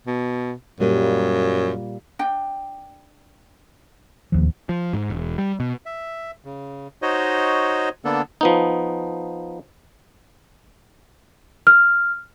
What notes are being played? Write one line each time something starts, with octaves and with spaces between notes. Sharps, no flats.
B2
F#2 A#2 G3 A#3
D4 G5
D1 D#2 F3
F3
G#2
E1
G3
B2
E5
C#3
D#4 F#4 C5 C#5 D#5
D3 A#3 B3 D4 A4
F3 B3 D#4
F6